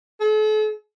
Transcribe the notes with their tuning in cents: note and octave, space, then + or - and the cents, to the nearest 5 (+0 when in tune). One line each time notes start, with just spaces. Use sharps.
A4 -45